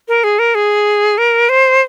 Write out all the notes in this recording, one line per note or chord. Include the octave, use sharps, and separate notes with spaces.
A#4
G#4
A#4
G#4
A#4
C5